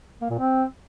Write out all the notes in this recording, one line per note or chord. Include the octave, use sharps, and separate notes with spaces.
A#3
A#2
C4